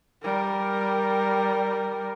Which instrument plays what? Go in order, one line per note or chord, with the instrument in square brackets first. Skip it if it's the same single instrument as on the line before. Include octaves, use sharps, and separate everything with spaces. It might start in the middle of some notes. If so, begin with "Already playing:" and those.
[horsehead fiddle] G3 A#4